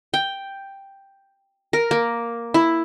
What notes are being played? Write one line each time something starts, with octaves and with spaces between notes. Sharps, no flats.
G5
A#4
A#3
E4